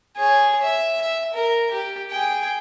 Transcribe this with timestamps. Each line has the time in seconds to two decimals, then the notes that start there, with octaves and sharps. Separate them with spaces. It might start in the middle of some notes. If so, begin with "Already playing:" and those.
0.17 G#4 C#5
0.62 E5
1.01 E5
1.33 A#4
1.71 G4
2.10 G#4 G5